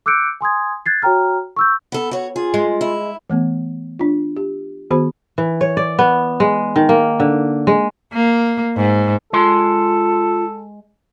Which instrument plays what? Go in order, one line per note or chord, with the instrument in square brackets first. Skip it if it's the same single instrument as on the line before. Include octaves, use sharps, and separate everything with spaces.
[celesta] D6 E6 F#6 G6 C#7 D7
G#5 C6 D#6 G#6
F#6 G#6 A6 C7
F#4 C#5 G5 A#5 F6
C#6 E6 G6
[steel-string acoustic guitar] B3 A4
F#4 C#5
[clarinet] F4 [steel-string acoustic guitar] G#4
[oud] G#3
[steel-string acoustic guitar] E4
[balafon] E3 A3 B3
D4 F4
G4
D#3 B3 F#4 G#4 C5 B5
[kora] E3
C#5
D5
B3
G#3
D#3
A#3
D3
G#3
[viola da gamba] A#3
G#2
[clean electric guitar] G#3 C6 [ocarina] F4 [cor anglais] A4